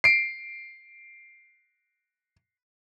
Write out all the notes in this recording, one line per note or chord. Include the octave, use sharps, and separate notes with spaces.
C7 D7